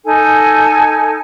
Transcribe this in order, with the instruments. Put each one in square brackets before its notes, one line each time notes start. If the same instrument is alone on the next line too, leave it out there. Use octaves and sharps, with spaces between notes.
[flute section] D#4 A4 G#5